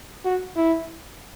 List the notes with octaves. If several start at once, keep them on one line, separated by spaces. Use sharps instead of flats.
F#4
E4